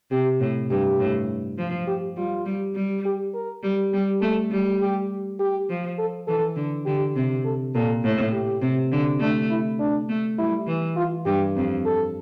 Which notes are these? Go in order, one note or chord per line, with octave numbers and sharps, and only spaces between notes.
C3 G4
A2
G2 G4
A2
F3
G4
G3 F4
G3
G3
G4
A#4
G3
G3 G4
A3 A4
G3
G4
G4
F3
A4
E3 A4
D3
D3 G4
C3
A4
A#2 A4
A2
G4
C3
D3
A3 D4
E4
D4
A3
G3 E4
E3
F4
G2 G4
F2
A4